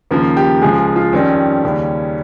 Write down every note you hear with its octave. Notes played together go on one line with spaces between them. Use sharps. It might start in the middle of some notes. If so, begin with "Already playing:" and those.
D#2 C#3 F3 A#3
G4
C#2 C#3 F3 G#3 G#4
G#4
F4
F2 D#3 G3 C#4
D#2 C#3 G3